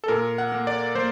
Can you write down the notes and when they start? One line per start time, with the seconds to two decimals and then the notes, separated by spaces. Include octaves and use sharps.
0.04 A4
0.08 A#2 A#4
0.38 F#5
0.52 A#3
0.67 D5
0.95 A#3 C5